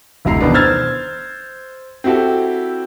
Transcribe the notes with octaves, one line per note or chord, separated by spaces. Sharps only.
F1 D2 A3 E4 A#5 C7
E2 B2 D#3 B3 D4
C5 E6 F6 G#6 A6
C4 E4 F#4 G4 A4